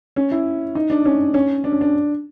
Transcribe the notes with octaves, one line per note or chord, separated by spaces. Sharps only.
C#4
E4
D#4
D4
C#4
C#4
D4
C#4
D4